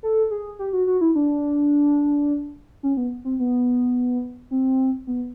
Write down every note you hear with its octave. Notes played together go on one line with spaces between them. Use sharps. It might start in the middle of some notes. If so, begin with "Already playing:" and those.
A4
G#4
G4
F#4
F#4
E4
D4
C#4
B3
C4
B3
C4
B3